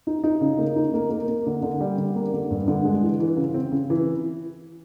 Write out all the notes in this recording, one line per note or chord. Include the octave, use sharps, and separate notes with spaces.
D#4
D#4
C#3
A#3
D#4
A#3
A#3
A#3
D3
D3
G3
D3
A#3
D3
G2
D3
G#3
E3
E3
C#3
C4
C#3
E3